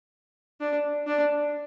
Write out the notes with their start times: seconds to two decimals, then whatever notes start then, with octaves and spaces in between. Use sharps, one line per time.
0.61 D4
1.07 D4